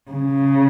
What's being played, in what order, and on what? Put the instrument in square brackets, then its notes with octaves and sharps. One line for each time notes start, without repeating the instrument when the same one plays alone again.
[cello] C#3